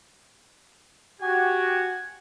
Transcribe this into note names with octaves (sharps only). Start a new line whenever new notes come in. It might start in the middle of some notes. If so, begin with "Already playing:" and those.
F#4 G4 G#5